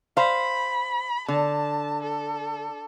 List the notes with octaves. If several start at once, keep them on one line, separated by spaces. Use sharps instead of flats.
C5 F5 B5
D3 A5
A4